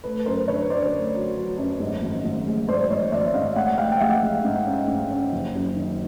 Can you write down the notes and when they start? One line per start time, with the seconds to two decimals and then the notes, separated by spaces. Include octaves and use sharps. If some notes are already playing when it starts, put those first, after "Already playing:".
0.04 A3 B4
0.26 F#2 A#4 C5
0.48 D3 B4 C#5
0.70 D3 C5 D5
0.92 A3
1.15 F#3
1.37 F#3
1.58 F#2
1.80 G#2
2.02 G#1
2.25 G#1
2.47 G#3
2.69 G#2 C5 D5
2.90 G#1 C#5 D#5
3.12 G#1 D5 E5
3.34 G#2 D#5 F5
3.56 G#3 E5 F#5
3.78 G#3 F5 G5
3.92 G5
4.00 G#3 E5 F#5
4.23 G#3
4.45 G#2
4.66 C#4
4.88 G#2
5.11 C#4
5.32 F#1
5.55 F#2
5.76 D#3